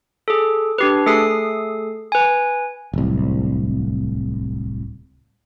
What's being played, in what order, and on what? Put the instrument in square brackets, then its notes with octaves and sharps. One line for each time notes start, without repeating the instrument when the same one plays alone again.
[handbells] G#4 A4
D4 G4 B4
A3 G#4 A4 D#6 C7
B4 G#5
[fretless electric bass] D1 C2